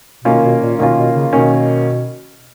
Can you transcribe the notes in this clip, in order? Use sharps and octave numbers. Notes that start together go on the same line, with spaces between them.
B2 D#3 A#3 C#4 F4
B2
A#2
B2 D#3 A#3 C#4 F4
B2
C#3
B2 D#3 A#3 C#4